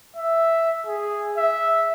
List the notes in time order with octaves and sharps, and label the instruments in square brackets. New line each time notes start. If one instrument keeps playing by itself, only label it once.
[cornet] E5
G#4
E5